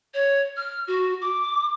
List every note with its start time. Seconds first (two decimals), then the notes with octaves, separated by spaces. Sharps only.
0.14 C#5
0.57 F6
0.87 F#4
1.21 D6